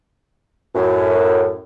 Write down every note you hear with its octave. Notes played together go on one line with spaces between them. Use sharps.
F#2 A2